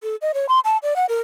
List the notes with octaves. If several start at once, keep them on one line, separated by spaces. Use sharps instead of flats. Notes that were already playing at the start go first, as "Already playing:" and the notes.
A4
D#5
C#5
C6
A5
D5
F#5
A#4